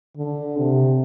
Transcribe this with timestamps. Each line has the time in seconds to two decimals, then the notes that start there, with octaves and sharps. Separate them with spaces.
0.17 D3
0.57 C3